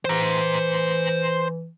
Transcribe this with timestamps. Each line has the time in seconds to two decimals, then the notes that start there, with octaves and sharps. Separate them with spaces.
0.05 E3 C5 A#5